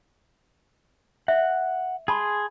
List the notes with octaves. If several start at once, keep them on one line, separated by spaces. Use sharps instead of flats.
E5 F#5
G#4 A5 B5 C6